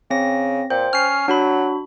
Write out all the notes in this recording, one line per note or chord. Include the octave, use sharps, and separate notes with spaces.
C#3 C4 A#6
A#2 C5 G5
C#4 F6 C7
F#3 D4 F#4 B5